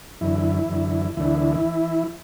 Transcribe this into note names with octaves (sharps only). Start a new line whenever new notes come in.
F#2 D3 E3 E4
F#2 D3
D2 D3 E3 E4